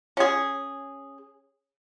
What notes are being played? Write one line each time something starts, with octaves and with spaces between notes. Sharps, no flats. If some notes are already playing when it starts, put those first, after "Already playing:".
C#4 G#4